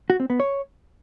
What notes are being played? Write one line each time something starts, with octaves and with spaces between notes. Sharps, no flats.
F#4
C4
B3
C#5